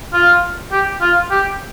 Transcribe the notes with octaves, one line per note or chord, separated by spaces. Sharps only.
F4
G4
F4
G4